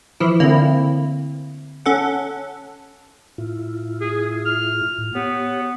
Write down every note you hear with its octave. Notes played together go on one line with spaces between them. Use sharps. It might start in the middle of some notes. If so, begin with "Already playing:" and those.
E3 F3 E4
D3 A#3 C4 E4
C#4 A4 F#5
A2 E4 F4
G#4
F6
A2
B3 G4 C#5